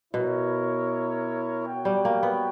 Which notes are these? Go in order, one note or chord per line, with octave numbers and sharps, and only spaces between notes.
B2 E4 A#4 C#5
F#4 C#5 G5
G3
A#3
B3